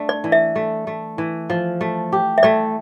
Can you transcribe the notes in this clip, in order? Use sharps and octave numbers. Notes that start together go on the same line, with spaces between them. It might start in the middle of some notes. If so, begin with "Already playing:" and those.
Already playing: A3 D4
D5
E3
E5
A3
A3
E3
F3
A3
G4
E5
A3 D5